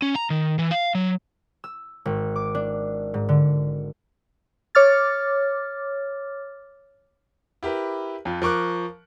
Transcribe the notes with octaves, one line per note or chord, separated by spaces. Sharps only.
C#4
A#5
D#3
E3
F5
F#3
E6
G#1
D6
D4
G#2
D3
C#5 D6 F6 A6
E4 G4 A#4 B4
F2 F4
F3 A#4 C#6 D6 F#6